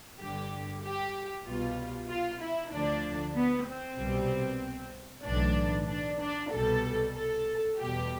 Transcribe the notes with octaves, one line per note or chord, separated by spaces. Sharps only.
G1 G2 D3 G4
G4
C2 B2 G3 F4
F4
E4
D2 D3 F3 D4
B3
C4
C2 B2 G3
B1 A2 E3 D4
D4
D4
C2 B2 G3 A4
A4
E2 B2 G3 G4